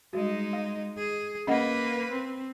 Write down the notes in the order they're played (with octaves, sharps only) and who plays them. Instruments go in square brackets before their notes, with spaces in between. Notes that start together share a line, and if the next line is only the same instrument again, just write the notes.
[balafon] G3 F#4 [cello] G#3 D#4
[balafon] F5
[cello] G#4
[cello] A#3 B4 [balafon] C#4 D#5 F#5
[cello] C4